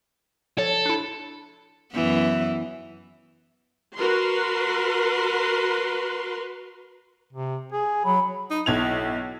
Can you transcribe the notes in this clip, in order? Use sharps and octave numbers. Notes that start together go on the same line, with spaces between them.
F3 A4 C#5 A5
D4 E4
F#2 E3 B3
F#4 A#4 B4 C6
C3
G#4
F#3 B5
D#4
B1 E4 G#6 F7